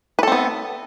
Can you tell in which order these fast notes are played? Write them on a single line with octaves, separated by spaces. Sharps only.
B4 A4 C4 B3